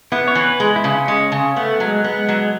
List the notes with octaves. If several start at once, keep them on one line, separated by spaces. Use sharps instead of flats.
B3 E4
C#5
E3
B4
G#3
E4
C#3
C#4
G#3
C#3
A3 B3
F#3 G#3
G#3 B3
F#3